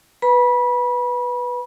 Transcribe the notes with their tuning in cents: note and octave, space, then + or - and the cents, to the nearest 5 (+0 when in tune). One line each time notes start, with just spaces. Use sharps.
B4 +0 B5 -30